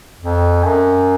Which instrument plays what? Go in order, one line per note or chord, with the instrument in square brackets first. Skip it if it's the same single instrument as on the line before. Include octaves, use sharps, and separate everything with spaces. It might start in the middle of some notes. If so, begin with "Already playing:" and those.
[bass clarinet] F2
F#2